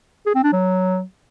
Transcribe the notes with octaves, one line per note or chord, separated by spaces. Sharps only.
G#4
C4
D4
F#3